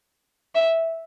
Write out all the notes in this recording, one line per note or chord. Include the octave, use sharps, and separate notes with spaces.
E5